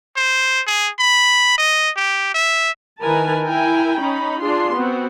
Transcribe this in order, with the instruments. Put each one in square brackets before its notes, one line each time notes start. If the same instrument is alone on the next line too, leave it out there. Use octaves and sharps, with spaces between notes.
[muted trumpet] C5
G#4
B5
D#5
G4
E5
[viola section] D#3 E4 A#4 B4 G#5 A5
E4 A#4 G5 G#5
C#4 D#4 B5
D4 F4 G#4 C6
B3 C4 F#4